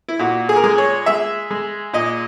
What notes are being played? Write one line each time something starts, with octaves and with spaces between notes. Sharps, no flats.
E4
A#2 F#4
G#4
A#4
G#3 G#4
C#5
G#3 E5
G#3
A#2 D#5